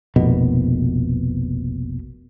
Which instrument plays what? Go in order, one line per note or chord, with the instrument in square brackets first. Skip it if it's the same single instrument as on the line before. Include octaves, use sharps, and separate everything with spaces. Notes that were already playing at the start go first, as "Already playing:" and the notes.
[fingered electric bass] F1 A#1 B2